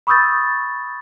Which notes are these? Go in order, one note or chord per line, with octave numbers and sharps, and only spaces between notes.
B5 C#6 D#6 E6 G6 A6